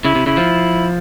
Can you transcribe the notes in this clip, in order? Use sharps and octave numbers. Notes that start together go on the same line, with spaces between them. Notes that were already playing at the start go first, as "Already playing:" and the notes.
C#3 E4
C3
C#3 E4
F3